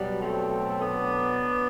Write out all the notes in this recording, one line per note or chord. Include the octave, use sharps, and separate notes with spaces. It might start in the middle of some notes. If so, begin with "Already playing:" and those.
Already playing: B2 F#3 G3 B3
A3 C4
B3 D4